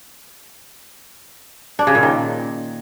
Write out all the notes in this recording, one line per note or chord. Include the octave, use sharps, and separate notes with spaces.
D4
C#3
A#2
D#3